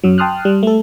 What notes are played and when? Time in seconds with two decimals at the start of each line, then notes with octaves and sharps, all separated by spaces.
0.04 F#2 F#3
0.18 G5 A5 C6 D#6 F6 F#6
0.45 G3
0.63 A3 A4